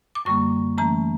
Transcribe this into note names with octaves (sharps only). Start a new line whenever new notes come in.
D6
F#2 D3 G3 A#3 C#6
E3 A3 C#4 A#5